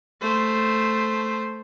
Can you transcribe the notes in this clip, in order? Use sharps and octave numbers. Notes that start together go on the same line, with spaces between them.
A3 C5